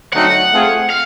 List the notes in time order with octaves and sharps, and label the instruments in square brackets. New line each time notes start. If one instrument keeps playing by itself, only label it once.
[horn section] D3 F#3 A3 C4 D#4 [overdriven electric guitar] F#5
[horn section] A3 C4 F4 G#4 C5
[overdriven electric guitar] F5